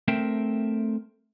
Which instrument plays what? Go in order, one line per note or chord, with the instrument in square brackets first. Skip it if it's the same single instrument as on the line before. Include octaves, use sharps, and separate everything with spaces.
[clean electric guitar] A3 C4 A#4 E5 G5